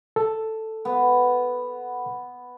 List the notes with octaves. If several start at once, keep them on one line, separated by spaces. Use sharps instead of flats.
A4
B3